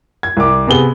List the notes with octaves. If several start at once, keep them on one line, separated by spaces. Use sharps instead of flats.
G#6
C2 D6
C3 B3 G#4 G7